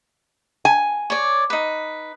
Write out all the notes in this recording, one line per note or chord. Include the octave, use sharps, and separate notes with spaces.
G#5
C#5 D5
D#4 B4